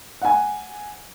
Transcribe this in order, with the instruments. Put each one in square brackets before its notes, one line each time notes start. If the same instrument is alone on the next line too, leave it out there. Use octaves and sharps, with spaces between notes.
[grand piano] F#5 G#5